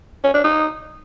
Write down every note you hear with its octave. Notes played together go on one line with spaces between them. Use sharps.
C#4
D4
D#4